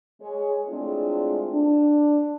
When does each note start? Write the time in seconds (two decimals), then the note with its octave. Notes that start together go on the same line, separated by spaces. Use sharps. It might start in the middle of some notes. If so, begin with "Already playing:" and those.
0.21 G#3 G#4 C#5
0.67 G#3 A3 C4 D4 E4 F4
1.53 D4